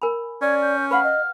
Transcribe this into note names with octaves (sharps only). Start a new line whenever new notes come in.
A#4 G#5 B5
C#4 D5 G#6
G6
B4 F5 F#5 B5 F6
D#5